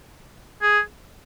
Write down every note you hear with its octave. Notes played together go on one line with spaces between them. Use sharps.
G#4